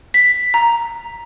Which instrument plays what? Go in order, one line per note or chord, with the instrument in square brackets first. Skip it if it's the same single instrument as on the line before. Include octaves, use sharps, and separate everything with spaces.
[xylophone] B6
A#5